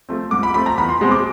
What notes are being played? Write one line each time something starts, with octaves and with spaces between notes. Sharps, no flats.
F3 A3 C4
G#2 D6
B5
F3 A3 C4 B5
A#5
E2 B5
C6
B2 G#3 C4
D6